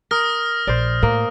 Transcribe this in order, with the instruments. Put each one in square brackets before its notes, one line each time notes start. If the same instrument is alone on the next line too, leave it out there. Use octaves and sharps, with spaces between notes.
[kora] A#4 [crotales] D#6 F6 A#6
[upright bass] A#1 [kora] C5 D5
[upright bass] A2 [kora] A#3